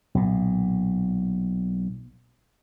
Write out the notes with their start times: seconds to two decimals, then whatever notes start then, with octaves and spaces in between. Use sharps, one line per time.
0.15 B1 A#2